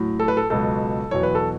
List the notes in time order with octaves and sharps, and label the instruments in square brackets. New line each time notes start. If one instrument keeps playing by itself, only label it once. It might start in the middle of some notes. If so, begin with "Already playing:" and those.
Already playing: [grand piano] A2 F#3
A4
B4
A4
C#2 B2 F#3 A4
E2 B2 F#3 C#5
B4
A4